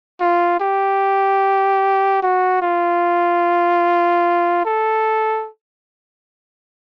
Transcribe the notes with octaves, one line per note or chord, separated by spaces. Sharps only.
F4
G4
F#4
F4
A4